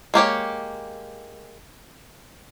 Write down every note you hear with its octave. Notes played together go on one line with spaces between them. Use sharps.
G#3 A#3 G4 C#5